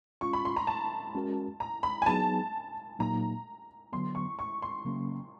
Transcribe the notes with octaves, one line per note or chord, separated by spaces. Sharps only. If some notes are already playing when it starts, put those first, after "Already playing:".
G#3 C#4 F4 C#6
B5
C6
A#5
A5
G#3 C#4 F#4 A#4
A#5
B5
G#5
F#3 B3 D#4 G#4 A5
A#2 F#3 A#3 D#4 A#5
D3 F#3 B3 C6
C#6
C#6
C6
C#3 F#3 A#3 C#4